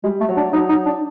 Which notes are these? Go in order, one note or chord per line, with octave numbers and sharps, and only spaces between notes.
G3 G#3
A3
F#3
D4
F#3 D#4
D#4
D4